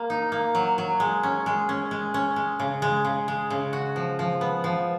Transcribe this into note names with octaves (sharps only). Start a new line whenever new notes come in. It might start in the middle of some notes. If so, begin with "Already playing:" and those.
Already playing: A#3
D#4
A#3
F#3
F#3
G#3
C#4
G#3
C#4
G#3
C#4
G#3
C#3
G#3
C#3
G#3
C#3
F#4
F3
F3
B3
F3